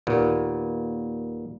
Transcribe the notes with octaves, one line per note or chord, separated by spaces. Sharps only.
D#2 A#2 B3